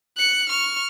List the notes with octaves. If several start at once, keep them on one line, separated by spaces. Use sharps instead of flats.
F#6 C#7
C#6 F6